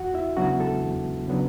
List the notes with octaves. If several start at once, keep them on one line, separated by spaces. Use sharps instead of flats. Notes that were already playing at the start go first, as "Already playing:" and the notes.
Already playing: E2 F#4 F#5
E4 E5
C#3 F#3 B3 D4 F#4 F#5
A4 A5
E2
C#3 F#3 B3 D4